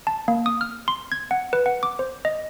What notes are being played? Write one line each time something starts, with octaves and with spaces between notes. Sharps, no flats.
A5
A#3
D#6
F6
C6
G#6
F#5
B4
F#5
D6
C5
D#5